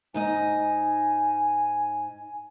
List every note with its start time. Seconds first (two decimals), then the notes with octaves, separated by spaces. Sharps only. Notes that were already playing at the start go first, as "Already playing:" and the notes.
0.14 G#2 D#4 D#5 G#5